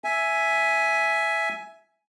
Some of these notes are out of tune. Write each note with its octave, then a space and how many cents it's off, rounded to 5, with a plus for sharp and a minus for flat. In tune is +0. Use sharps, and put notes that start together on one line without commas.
E5 +0 G#5 +10